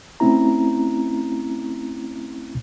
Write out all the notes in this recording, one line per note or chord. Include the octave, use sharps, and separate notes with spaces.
A3 C4 C#4 E4 A#5